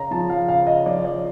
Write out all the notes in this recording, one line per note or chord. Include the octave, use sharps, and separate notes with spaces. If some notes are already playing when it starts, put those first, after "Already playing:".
Already playing: C#3 A#5
F3 A5
F5
C#3 F5
D#5
F3 D5
D5